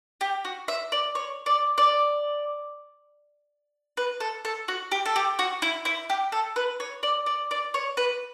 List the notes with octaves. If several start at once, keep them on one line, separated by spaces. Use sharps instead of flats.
G4
F#4
E5
D5
C#5
D5
D5
B4
A4
A4
F#4
G4
A4
G4
F#4
E4
E4
G4
A4
B4
C#5
D5
D5
D5
C#5
B4